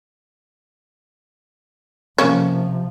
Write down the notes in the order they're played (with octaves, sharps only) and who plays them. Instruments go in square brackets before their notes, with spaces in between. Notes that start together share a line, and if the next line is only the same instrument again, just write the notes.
[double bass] C3 F3 [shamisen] A#3 C#4 C#5